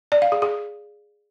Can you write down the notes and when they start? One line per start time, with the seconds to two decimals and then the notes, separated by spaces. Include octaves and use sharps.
0.12 D5
0.22 F5
0.32 G#4
0.42 G#4